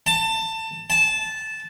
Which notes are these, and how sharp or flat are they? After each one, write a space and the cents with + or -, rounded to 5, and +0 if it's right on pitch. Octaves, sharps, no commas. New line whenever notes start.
A5 +25
A5 -10